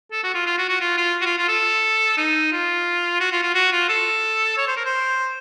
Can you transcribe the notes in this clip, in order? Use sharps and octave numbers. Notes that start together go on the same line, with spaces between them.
A4
F#4
F4
F4
F#4
F#4
F4
F4
F#4
F4
F4
A4
D#4
F4
F#4
F4
F4
F#4
F4
A4
C#5
C5
A#4
C5